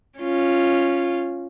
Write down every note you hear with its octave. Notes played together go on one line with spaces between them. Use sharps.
C#4 F4